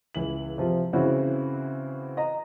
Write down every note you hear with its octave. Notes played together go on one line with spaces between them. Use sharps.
C#2 E3 F#7
C3 F3 F4
C#3 E3 C4 E4 F#4
D#5 A#5